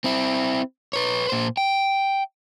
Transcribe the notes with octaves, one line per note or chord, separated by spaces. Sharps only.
C4 E4
B4 C#5
A#2 C5
G5